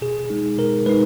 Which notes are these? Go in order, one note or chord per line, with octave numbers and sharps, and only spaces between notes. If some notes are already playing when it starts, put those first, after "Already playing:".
B2 G#4
G#3 D#4
B2 A#4
G#3 D#4 B4